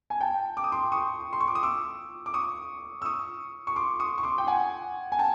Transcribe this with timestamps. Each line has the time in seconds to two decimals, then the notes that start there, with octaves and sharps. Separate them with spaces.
0.10 G#5
0.21 G5 A5
0.57 D6
0.64 D#6
0.72 C6 D6
0.92 C#6 D#6
1.33 C6
1.40 C#6
1.48 D6
1.55 D#6
1.63 D6 E6
2.26 D6
2.34 C#6 D#6
3.02 E6
3.05 C#6 D#6
3.67 C#6
3.76 C6 D6
4.00 C#6 D#6
4.18 C#6
4.23 C6 D6
4.38 G5
4.47 F#5 G#5
5.12 G#5
5.19 G5 A5